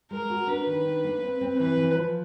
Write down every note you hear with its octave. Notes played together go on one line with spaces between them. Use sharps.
G#3 A#4
F#4
D4 B4
D#3
D4
A#3
C4
C4
E3 B4
E3
F3